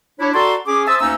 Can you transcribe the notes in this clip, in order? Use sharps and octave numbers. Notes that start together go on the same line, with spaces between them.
D4 E4 C#5
F#4 A4 D5 A5 A#5 C6
C#4 G#4 D6
C5 E5 A5 D#6 E6
D2 A#3 C#4 D#4 A#5 E6